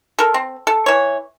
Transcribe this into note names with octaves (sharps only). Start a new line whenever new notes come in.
A4 A#4
C4
A4
E3 C#5